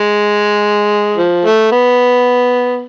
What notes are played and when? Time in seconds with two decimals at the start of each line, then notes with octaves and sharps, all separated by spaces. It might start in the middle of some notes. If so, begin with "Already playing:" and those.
Already playing: G#3
1.17 F3
1.45 A3
1.72 B3